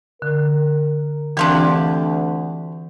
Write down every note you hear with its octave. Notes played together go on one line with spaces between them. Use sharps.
D3 A#4
D2 E3 C4 D4 F4 G4